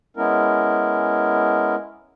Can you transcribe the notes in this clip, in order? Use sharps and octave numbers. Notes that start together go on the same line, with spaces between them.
G#3 B3 C#4 E4 A#4